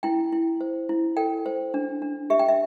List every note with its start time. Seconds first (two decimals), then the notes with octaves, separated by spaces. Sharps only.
0.03 E4 G5
0.32 E4
0.61 C5
0.89 E4
1.17 A4 G5
1.46 C5
1.74 D4
2.02 D4
2.30 G4 E5
2.39 G5
2.49 E5